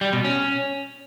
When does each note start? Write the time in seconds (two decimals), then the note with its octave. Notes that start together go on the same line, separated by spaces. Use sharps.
0.01 G3
0.13 B2
0.24 C#4